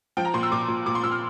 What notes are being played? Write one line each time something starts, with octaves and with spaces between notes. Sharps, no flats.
F3 G5
A#5
A#2 C6
E6
A#2 D6
A#2
A#2 D6
C6
A#2 E6
F6